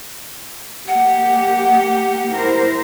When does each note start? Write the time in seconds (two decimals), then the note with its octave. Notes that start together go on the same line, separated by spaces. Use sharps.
0.88 A#3 G4 F#5
2.31 E4 A#4 C5